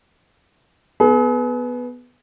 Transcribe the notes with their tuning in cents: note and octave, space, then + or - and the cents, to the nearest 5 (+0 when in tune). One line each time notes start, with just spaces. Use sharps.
B3 +0 G#4 +40